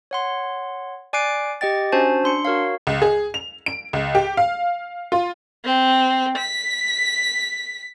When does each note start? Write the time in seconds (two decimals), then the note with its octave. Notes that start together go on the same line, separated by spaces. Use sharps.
0.11 C#5 F#5 C6
1.13 D5 G#5 D6 F#6 C7 D7
1.61 G4 D#5 G5 A6
1.92 C#4 D4 F#4 C5 G#5 A5
2.24 D4 C6 C#7
2.45 F#4 A#4 C#5 F5
2.87 C#2
3.02 G#4
3.34 F7
3.66 D7
3.93 C#2
4.15 G4
4.37 F5
5.12 F4
5.65 C4
6.38 B6